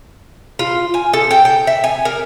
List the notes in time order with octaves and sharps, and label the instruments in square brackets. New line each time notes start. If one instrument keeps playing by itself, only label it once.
[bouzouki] F4
G#5
A4
G5
G5
E5
G#5
A#4